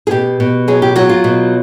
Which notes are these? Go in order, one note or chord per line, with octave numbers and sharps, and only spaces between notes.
G#4
B2 G4
B2
F#3 G#4
G4
F#3 F#4
F4
B2